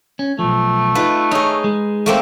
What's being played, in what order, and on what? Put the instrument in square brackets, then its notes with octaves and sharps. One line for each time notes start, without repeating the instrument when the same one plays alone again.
[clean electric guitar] C#4
[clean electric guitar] B1 F3 [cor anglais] A3
[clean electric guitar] D#4 F4 [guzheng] B4
[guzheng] D#4 G#4 [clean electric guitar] C#5
[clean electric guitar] G#3
[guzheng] A3 A#3 C4